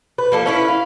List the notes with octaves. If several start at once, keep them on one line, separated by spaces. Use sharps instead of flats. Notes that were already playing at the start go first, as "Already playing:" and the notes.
B4
F3 A#3 A4
C#4 E4 B4
F5